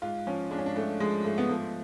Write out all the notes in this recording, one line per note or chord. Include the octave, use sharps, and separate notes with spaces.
G#2 F4
F3 C#4
G#2 D4
C#4
D4
G#2 A3
F3 G#3
G#2 A3
B3
F3 A3